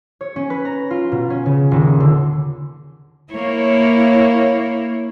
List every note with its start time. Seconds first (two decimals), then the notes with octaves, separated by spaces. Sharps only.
0.21 C#5
0.36 C#4
0.50 B4
0.65 A#5
0.91 F4
1.12 B2
1.30 C#4
1.46 C#3
1.71 D#1
2.00 D3
3.33 A#3 E4 C#5